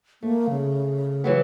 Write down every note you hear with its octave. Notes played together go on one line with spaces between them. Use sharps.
A3 A#3
C#3
E3 F#3 B3